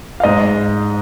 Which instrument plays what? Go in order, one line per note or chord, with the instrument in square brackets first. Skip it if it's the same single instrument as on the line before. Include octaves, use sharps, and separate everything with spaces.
[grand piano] F5
G#2 D#5